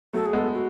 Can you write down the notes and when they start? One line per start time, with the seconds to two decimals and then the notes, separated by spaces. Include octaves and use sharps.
0.13 F#3 A3 A4
0.26 G#4
0.33 G#3 B3 A4
0.53 F#4